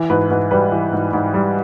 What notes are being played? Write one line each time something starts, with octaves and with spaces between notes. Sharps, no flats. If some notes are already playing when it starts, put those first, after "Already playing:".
Already playing: E3
G#2 B4
G#2 B4
G3 B4
E3
G#2
G#2
G3